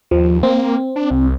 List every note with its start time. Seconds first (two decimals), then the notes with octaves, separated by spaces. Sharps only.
0.11 D#2 F3
0.43 A#3 C4
0.96 D4
1.11 C2